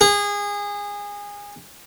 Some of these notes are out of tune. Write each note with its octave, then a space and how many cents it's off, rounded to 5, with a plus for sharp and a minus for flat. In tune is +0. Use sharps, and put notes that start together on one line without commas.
G#4 -25